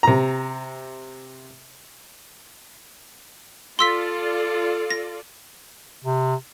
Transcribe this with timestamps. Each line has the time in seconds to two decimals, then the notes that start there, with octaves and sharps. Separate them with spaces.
0.03 C3 A#5
3.79 F4 A4 D5 C6 E6 B6
4.91 A#6
6.05 C3